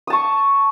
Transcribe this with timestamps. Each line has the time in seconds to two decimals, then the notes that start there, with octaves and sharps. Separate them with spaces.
0.07 D#6
0.10 A5
0.13 C#6